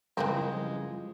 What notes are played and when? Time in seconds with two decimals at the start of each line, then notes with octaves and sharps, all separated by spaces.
0.17 F#2 C#3 E3 F3 G3 G#3 A#3 C4